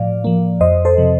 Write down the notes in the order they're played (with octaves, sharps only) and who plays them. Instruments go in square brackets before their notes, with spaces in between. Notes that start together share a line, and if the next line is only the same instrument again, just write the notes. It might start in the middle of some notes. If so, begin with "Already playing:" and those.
Already playing: [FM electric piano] A2 F3 D5 F5
F3 A#3
F2 C5 D#5
A4 C5
C3 F3